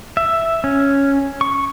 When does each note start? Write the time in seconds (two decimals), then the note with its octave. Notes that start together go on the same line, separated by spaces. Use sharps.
0.17 E5
0.64 C#4
1.41 C#6